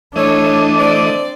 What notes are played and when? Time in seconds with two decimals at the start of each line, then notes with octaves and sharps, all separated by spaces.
0.16 E3 A3 D4 A4 C#5 D#5
0.78 C4 D5